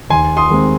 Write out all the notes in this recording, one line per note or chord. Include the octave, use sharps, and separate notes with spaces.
D#2 G#5 C6
C6 D#6
D#3 G#3 C4